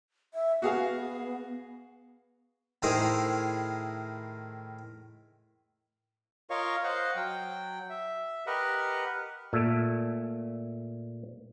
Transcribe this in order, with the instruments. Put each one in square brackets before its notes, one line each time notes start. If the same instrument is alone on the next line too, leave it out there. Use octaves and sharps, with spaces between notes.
[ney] E5
[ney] B3 [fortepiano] F#4 G#4 F5
[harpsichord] A2 D#3 E4 G#4 A#4 C5
[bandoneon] F4 A#4 C#5 D#5 F5 C#6
C5 D#5 F5 F#5
F#3 G5
E5
G4 A#4 B4 D#5 F#5
[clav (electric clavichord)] A#2 A3 E5